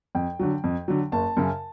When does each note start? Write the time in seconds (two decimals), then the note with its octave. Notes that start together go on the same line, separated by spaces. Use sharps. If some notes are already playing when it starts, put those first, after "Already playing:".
0.15 F2 G5
0.39 D3 F#3
0.64 F2
0.88 D3 F#3
1.12 F#1 A5
1.37 F#2 C#3